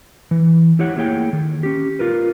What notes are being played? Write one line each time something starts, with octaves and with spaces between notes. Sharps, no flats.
E3
E4 G4 C#5 E5 F#5
A3 A#3 E4 G#4 C#5 G5
D#3
C#4 G4
F4 A#4 B4